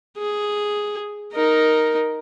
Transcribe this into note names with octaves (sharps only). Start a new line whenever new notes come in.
G#4
D#4 A#4